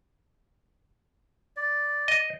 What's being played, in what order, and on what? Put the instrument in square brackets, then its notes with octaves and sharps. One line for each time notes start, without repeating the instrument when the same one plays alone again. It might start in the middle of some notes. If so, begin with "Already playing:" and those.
[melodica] D5
[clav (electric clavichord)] D#5